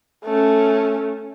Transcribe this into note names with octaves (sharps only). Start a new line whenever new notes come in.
A3 C#4